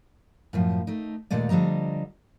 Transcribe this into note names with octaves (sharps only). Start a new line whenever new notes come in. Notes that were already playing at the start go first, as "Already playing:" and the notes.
F#2 A2 F3
A3 D#4
D#2 A#2 G#3 A3 D5
D3 F3 G3 D#5 A#5